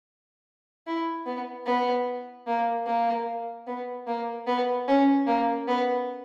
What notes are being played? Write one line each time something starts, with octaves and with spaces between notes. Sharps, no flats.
E4
B3
B3
A#3
A#3
B3
A#3
B3
C#4
A#3
B3